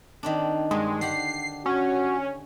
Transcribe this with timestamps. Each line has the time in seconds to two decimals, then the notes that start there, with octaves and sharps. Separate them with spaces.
0.23 D#3 C4 D4
0.71 G2 G#3
1.01 D3 G4 F#5 C7
1.66 C#4 F#4